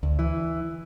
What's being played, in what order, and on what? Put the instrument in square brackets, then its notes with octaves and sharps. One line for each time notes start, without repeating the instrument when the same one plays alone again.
[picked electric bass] D2
E3